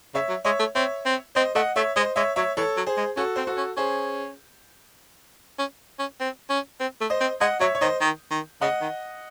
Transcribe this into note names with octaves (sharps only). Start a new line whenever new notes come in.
C#3 C#5 E5
F#3
G#3 C#5 E5
A3
C4 C#5 E5
C4
C4 C5 D#5
A3 D#5 F#5
A3 C#5 E5
G#3 C5 D#5
G#3 C#5 E5
F#3 C#5 E5
E3 A4 C#5
F#3
G#4 C5
G#3
C#4 F#4 A4
C4 C5
F#4 A4
C#4
C#4 G#4 C5
C#4
C#4
C4
C#4
C4
A3
C5 D#5
C4
G#3 D#5 F#5
F#3 C#5 E5
C#5
D#3 C5 D#5
D#3
D#3
C#3 D#5 F#5
D#3